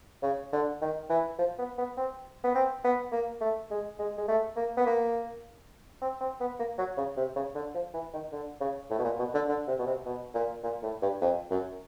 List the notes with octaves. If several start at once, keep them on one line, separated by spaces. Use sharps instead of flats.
C#3
D3
D#3
E3
F3
B3
B3
C4
B3
C4
B3
A#3
A3
G#3
G#3
G#3
A3
A#3
B3
A#3
C4
C4
B3
A#3
F#3
C#3
C3
C#3
D3
F3
E3
D#3
D3
C#3
A2
B2
A#2
B2
D3
D3
C3
B2
C3
B2
A#2
A#2
A2
G2
F2
F#2